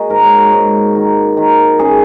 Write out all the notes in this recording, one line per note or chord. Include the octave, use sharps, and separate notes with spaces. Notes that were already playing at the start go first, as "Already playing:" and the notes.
Already playing: A#3 F#4 G#4 D#5 F#5
G#2 A#4
C#5
F#4 A#4
G#2
D#3
D#3
C#4 G#4